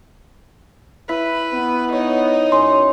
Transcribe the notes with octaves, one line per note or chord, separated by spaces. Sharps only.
E4 B4 B6
B3
D#4 C#5
F#2 C#4 C6